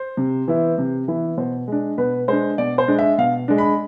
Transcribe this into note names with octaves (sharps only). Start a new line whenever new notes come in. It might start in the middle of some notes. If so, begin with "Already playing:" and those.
Already playing: C5
C3
E3 B3 E4
C3
E3 B3 E4
B2 C5
G#3 D4
B2 B4
G#3 D4 C5
B2 D5
C5
G#3 D4
E5
B2 F5
G#3 D4
B5